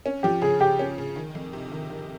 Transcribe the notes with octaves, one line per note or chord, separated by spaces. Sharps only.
C#4
F3 G4
C#3 G#4
C#3 G4
C#4
C#3
D#3
F2
C3
D#3
D#3